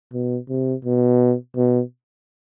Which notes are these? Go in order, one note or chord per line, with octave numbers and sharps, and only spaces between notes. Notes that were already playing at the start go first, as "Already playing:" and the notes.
B2
C3
B2
B2